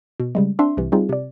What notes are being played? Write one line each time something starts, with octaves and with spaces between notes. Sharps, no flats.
B2
C#3 G3 G#3
C4 D4 E5 C6
C2 C3 E3
G3 C4 D#4 F4 G#4
C3 D5